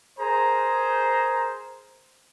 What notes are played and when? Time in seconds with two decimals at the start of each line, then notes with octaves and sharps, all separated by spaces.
0.20 G#4 A#4 C5 A#5